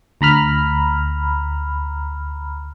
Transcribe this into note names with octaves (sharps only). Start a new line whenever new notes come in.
D2 A#5 B5 F6